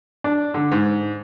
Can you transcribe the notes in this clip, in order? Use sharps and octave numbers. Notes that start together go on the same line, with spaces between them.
D4
D3
G#2